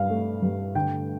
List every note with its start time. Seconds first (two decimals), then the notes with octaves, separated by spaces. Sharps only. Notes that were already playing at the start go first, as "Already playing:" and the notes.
Already playing: G2 F5
0.10 A3
0.42 G2
0.75 D3 G5